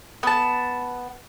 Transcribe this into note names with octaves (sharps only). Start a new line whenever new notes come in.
B3 A5